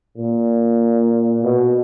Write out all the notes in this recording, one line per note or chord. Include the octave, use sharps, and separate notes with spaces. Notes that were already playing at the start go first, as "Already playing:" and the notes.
A#2
B2